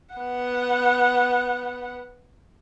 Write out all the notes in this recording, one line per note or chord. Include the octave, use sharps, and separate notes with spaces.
B3 F#5